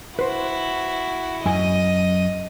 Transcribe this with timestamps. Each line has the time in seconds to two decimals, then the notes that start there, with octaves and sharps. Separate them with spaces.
0.19 E4 F#4 B4 C5
1.46 F#2 D#5 G#5 D#7